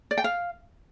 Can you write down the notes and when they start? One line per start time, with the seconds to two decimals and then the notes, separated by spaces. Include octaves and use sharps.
0.11 D5
0.18 G5
0.24 F5